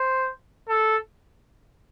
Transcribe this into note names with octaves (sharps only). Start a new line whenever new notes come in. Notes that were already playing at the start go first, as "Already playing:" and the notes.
Already playing: C5
A4